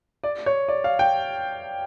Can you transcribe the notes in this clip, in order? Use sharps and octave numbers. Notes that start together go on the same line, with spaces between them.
D5
C#5
D5
F5
G5